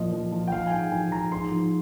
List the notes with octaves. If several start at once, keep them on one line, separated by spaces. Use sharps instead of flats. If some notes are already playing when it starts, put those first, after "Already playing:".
Already playing: A#2 F3 D#5
F3
F3
G5
F3 F5
G#5
G#2 G5
F3 G#5
F3 A#5
G#2 C6
F3